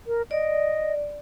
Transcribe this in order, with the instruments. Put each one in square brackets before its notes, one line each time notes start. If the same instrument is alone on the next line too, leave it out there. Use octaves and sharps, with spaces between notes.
[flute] A#4
[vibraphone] D5 [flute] D#5